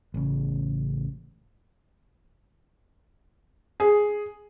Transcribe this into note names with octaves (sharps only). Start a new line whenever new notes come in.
A1 C#3
G#4